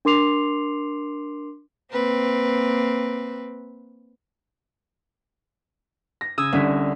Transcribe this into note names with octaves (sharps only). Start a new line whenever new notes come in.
D4 A#4 C6 D6 C7 F7
A#3 C4 B4
A#6
C#3 D#6 E6 G#6
C2 D3 C#4 B6